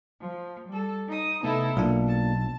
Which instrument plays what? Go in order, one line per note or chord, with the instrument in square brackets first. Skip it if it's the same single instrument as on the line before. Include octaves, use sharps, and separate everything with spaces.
[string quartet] F3
G3 A4
D#4 D#6
[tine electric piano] C3 A3 B3 [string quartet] D#4 E4 A4
[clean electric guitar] B1 [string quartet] B2 [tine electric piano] A#3 D4 F4
[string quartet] A5